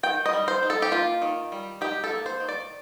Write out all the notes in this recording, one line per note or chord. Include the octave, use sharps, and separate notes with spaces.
D#3 G5
D#5
G3
C5
D#4
A4
G4
A#3 F4
D#3
G3
D#4 G4
A4
A#3
C5
D#3
D5